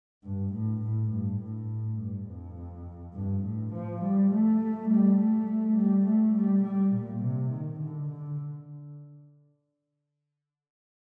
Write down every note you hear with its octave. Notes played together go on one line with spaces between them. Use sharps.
G2
A2
A2
G2
A2
G2
F2
G2
A2
F3
G3
A3
G3
A3
G3
A3
G3
G3
A#2
C3
D#3
D3
D3